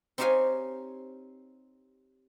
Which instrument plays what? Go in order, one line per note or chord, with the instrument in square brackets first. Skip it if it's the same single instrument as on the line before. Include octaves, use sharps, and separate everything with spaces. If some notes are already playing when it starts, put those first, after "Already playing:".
[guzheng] C4 D#4 G4 C#5 F5 G#5